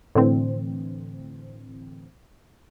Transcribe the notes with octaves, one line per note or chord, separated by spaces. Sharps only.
A2 D3 E3 C4